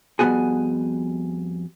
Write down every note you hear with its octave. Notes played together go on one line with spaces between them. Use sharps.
F2 G3 B3 C4 F#4 G#4